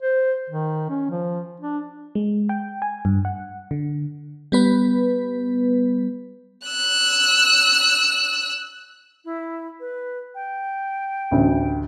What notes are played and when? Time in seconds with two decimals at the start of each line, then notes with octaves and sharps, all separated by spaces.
0.02 C5
0.50 D#3
0.90 C#4
1.10 F3
1.60 D4
2.15 G#3
2.49 G5
2.82 G#5
3.05 G2
3.25 F#5
3.71 D3
4.52 G3 B3 B4
6.68 E6 F#6
9.25 E4
9.80 B4
10.35 G5
11.31 A1 D2